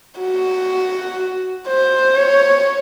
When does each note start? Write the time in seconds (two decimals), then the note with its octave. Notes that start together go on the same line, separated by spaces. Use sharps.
0.20 F#4
1.67 C5
2.17 C#5